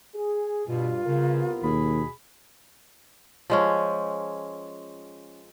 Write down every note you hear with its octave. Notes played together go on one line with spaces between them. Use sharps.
G#4
G2 B2 F4
C2 C#3 B3 A#4
D#2 B2 G#4 B5
F3 G#3 C#4